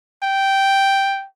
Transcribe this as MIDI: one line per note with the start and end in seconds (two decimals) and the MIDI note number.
0.23 1.26 79